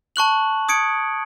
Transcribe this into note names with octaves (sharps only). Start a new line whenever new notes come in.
A5 C#6 F#6 F#7
D#6 G#6 C#7 D7